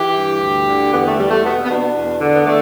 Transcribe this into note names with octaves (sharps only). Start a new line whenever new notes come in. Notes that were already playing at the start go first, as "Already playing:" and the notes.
Already playing: E3 G4
G2
D2
D3
E2 B3
A3
E2 G3
A3
B2 B3
B3
B2 D4
E2
D3
B3
D3 A3